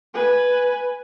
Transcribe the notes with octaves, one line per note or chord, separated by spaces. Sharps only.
B4 G#5